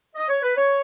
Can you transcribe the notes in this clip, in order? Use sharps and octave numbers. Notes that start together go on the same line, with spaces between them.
D#5
C#5
B4
C#5